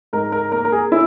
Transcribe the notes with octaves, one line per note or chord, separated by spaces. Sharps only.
G#2 A#4
A#4
A#3 A#4
A#4
G#4
C#4 E4